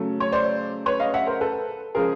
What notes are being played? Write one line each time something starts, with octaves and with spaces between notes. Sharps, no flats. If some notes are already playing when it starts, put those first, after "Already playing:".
Already playing: C#3 F#3 A3
C#5
C5 D5
B4 C#5
D#5 F5
E5 F#5
A#4 C5
A4 B4
C#3 F3 G#3 G#4 A#4